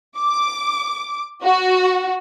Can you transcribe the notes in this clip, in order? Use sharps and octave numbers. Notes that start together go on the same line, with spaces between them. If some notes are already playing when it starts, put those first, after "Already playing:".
D6
F#4